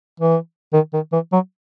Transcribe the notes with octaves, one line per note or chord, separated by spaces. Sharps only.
E3
D#3
D#3
E3
F#3